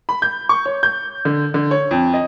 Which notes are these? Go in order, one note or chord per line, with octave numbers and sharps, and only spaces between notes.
B5
G6
C#6
C#5
G6
D3
D3
C#5
F2
D#5